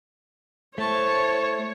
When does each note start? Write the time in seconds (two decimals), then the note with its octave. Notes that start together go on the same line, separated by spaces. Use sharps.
0.78 A3 E4 C5 C#5 A5 C#6